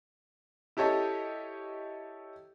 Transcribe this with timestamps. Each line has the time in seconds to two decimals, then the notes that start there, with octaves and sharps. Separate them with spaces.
0.77 E4 G4 A4 C#5 D#5